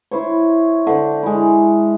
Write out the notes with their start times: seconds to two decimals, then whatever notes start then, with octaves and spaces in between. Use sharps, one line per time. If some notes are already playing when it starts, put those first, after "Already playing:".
0.11 E4 C5 C#5
0.87 D3 C5
1.23 G#3 E4